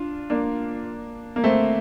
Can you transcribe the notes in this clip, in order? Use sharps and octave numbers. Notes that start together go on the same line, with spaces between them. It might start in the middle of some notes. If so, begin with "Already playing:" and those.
Already playing: D4 F4
A#3 D4
A#3
A3 C4